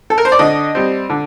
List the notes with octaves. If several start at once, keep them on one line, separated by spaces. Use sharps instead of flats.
A4
A#4
C5
D5
D3 D#5
G3 C4
D3